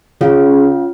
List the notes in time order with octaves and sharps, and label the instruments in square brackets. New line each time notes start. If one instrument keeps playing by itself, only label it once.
[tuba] C#3 [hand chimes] C#4 F4 F5